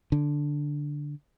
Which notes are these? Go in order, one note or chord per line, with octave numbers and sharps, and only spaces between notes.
D3